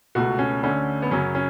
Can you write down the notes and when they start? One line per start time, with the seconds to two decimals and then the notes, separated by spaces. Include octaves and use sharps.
0.15 C#2 B2 A3 F#4
0.39 C#4
0.63 D2 D3 A3 C#4
1.02 B3
1.11 F#2 C#3 F#3 C#4
1.35 C#4